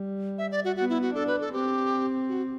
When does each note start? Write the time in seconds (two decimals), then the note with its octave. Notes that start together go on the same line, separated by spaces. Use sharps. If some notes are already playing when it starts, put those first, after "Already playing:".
Already playing: G3
0.38 E5
0.51 D5
0.64 F#4
0.76 B3 F#4
0.90 E4
1.02 F#4
1.15 D4 A4
1.27 B4
1.41 A4
1.53 C4 G4
2.29 F#4